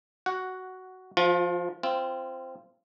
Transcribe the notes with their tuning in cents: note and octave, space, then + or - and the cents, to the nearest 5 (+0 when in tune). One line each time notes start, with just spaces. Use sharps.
F#4 +10 F#5 +0
F3 -5 F4 +35
C4 +0 F4 -25